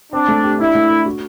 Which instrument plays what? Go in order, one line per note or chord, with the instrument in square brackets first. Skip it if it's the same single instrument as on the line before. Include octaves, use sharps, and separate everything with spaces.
[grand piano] C4 [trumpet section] D4
[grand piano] A3
G4
[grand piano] D4 [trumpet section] E4
[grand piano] A3
A4
F#4